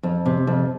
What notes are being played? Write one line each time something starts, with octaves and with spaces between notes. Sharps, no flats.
F2
C3
F2